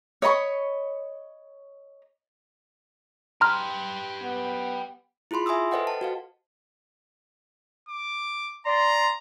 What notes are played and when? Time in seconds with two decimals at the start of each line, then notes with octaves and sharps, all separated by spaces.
0.22 C#5 D#5 B5 C#6
3.41 G4 B4 A#5 C6 F6
4.24 B3
5.31 E4 F4 G#4 B5 C6
5.46 E5 G#5 C6 D#6 E6
5.71 A4 B4 C5 D#5 F#5 G5
5.87 A5
6.01 F#4 C5 F5
7.89 D6
8.66 D5 A#5 C6